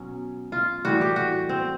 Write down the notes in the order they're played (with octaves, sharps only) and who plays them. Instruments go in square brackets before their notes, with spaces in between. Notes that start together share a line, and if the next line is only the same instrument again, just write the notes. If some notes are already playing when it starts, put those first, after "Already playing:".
Already playing: [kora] B2 F#3 C#4
F4
A2 E3 G3 F#4
G4
F#4
C4